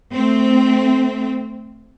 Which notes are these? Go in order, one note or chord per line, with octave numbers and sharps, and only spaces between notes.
A3 C4